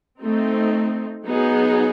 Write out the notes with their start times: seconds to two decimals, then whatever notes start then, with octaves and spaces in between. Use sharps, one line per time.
0.20 A3 C4 D#4
1.25 F#3 B3 D#4 G#4